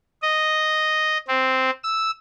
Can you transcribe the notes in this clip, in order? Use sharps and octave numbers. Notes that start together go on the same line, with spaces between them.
D#5
C4
E6